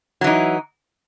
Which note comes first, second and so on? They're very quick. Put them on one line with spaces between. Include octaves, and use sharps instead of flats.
F#3 E3 D#4